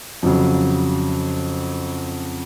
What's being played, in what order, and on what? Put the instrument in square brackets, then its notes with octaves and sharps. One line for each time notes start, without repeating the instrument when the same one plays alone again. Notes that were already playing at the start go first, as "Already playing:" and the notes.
[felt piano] F2 C#3 F#3